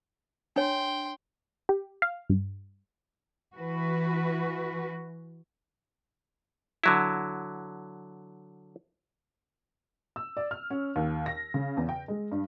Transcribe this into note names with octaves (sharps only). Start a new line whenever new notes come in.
D4 C#5 G5 C6
G4
F5
G2
E3 F#4 B4
D3 F#3 E4
E6
D5
F6
C#4
D#2
A#6
C#3
E2
G5
G#3
G2